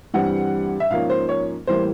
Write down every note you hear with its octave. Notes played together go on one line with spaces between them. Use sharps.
G2 E3 G3 C4 F#5
E5
G#2 F3 A#3 C#4 F5
C5
C#5
A2 E3 G3 A#3 C5